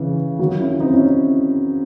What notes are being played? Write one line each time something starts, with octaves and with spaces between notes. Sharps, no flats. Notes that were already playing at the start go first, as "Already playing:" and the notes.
Already playing: C#3 E3
D#3 F#3
C#4 E4
C4 D#4
C#4 E4